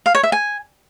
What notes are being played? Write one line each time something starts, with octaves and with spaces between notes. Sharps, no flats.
F5
C#5
E5
G#5